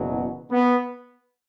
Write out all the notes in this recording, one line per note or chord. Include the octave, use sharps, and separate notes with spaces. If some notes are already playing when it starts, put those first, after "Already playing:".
Already playing: F#1 E2 B2 F#3
B3